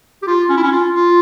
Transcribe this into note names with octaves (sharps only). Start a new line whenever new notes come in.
G4
F4
C#4
E4
C#4
F4
F4